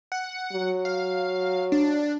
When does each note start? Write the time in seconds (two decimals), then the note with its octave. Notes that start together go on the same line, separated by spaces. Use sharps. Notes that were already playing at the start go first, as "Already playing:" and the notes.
0.12 F#5
0.53 F#3
0.85 F5
1.72 D4